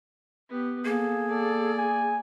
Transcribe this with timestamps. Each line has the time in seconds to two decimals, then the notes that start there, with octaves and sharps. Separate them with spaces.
0.49 B3 G4
0.85 A#3 G#4 A4
1.31 A4 D5
1.78 G#5